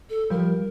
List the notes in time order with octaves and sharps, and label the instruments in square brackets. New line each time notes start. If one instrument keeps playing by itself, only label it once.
[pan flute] A4
[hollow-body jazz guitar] F3 G3 [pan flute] A#4